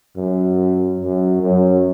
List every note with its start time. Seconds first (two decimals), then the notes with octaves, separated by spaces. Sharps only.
0.17 F#2
1.00 F#2
1.42 F#2